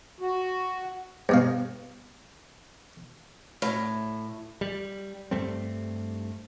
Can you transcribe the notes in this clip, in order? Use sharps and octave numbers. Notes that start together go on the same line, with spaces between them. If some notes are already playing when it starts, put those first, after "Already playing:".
F#4
G2 B2 F5
A2
G3
G2 G3 A3 C4